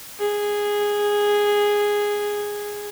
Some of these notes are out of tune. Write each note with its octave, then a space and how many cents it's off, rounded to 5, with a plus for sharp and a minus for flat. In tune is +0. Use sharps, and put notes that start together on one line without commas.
G#4 -10